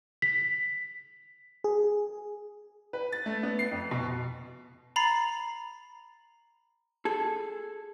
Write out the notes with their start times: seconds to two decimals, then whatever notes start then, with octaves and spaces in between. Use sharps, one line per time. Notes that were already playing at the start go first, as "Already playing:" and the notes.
0.22 B6
1.64 G#4
2.93 B4
3.12 A6
3.26 A3
3.43 B3
3.59 C7
3.71 F2
3.91 B2
4.96 A#5 B5 A6 C7
7.05 G#4 A4